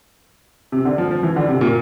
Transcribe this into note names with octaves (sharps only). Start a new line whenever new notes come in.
C3
D3
F3
F3
E3
D3
C3
A#2